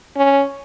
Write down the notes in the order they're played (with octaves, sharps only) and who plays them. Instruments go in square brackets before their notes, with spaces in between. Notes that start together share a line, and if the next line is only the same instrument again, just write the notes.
[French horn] C#4